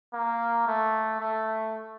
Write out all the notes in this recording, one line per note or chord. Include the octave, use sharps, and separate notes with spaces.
A#3
A3
A3